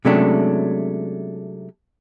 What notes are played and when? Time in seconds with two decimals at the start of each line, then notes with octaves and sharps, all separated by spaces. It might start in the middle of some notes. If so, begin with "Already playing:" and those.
0.05 C3 F#3 G#3 A3 C#4 D4